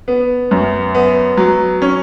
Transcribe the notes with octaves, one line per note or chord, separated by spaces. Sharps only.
B3
F#2
B3
F#3
C#4